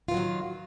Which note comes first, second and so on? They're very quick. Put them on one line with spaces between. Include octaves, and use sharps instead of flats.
F4 E3 F#3 D#3